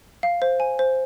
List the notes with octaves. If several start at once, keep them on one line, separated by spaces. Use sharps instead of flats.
F5
C5
G#5
C5